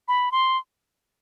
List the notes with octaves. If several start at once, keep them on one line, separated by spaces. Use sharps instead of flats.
B5
C6